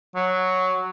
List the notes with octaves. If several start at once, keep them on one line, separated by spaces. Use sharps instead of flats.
F#3